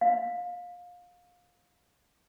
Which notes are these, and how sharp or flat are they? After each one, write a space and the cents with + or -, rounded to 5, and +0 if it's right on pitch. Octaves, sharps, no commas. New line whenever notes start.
F5 +25